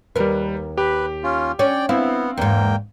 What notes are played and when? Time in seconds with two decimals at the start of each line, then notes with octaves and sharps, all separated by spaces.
0.16 D#2 G3 A#4 B4
0.78 G4 B4
1.24 C#4 F4
1.59 C#4 D5 G5
1.89 B3 C4 E4 F5
2.38 E2 G#2 A#3 G5